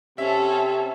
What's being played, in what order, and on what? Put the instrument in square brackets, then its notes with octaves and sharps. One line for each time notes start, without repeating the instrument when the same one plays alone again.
[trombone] C3 [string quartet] C#4 A4 [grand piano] E5